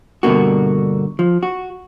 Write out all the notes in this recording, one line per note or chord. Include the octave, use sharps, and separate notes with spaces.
G2 B2 D3 A#3 F#4
F3
F#4